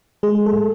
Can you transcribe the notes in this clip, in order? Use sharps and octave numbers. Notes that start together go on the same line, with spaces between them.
G#3 G#4
A4
A2